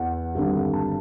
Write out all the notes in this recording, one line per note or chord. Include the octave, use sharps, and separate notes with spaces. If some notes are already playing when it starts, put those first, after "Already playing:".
Already playing: E2 F#5
G#1 G2 D3 G3
A5